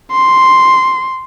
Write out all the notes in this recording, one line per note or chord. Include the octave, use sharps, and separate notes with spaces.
C6